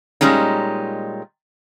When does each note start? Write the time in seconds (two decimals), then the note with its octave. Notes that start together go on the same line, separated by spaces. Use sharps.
0.21 A#2 G3 G#3 C#4 D#4